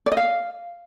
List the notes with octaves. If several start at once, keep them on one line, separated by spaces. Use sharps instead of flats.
D5
D#5
F5